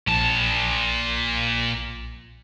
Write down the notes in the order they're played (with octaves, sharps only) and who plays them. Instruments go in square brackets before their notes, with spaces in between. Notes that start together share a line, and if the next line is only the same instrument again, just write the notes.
[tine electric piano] A#1 [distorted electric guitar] A#2 A5